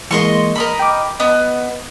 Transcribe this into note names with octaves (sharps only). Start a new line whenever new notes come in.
E3 G#3 A#3 D#5 C6 C#6
A#4 D#5 B5
G5 D6
B3 D#5